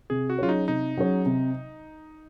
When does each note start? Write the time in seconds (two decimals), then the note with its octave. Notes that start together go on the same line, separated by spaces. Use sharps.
0.10 C3 G#4
0.30 F#4
0.39 F#3 C#4 F4 G#4 C#5
0.49 D#4
0.68 C3 D#4
0.97 F#3 C#4 G#4 C#5
1.26 C3